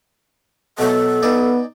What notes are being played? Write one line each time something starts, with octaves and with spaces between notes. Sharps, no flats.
B2 F#3 A4
B3 D#4 D5 G#5